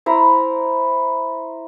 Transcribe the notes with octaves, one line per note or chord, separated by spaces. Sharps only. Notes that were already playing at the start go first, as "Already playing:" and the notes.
E4 C5 A#5